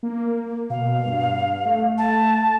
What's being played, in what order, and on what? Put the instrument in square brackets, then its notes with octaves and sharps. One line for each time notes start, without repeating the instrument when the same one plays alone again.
[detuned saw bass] A#3
[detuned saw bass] B2 [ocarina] F5
[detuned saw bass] G2
A3
[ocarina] A5